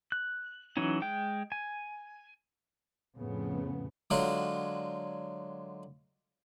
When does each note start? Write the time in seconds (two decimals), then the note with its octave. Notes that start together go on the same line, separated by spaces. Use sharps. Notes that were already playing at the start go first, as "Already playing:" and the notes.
0.12 F#6
0.77 E3 F#3 C#4 D#4
1.02 G#3 G5
1.52 G#5
3.16 F2 A2 C#3 B3
4.10 D3 F#3 G#3 F4